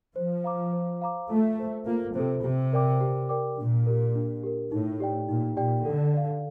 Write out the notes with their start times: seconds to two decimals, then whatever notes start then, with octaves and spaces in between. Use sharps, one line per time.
0.16 F3 C5
0.44 F5 A#5 D6
0.73 C5
1.02 F5 A#5 D6
1.30 A3 F4
1.59 A4 C5
1.87 A#3 F4
2.15 C3 A4 C5
2.43 C3 G4
2.73 A#4 D5 G5 D6
3.01 G4
3.29 A#4 D5 G5 D6
3.58 A#2 D4
3.87 G4 A#4
4.15 D4
4.43 G4 A#4
4.71 A2 D#4
5.00 G4 D5 G5
5.29 A#2 D#4
5.57 A#2 G4 D5 G5
5.86 D3 A4
6.14 D5 F5